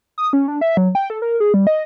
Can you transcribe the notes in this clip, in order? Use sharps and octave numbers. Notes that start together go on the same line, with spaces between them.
D#6
C#4
D4
E5
F#3
G5
A4
A#4
G#4
G3
D#5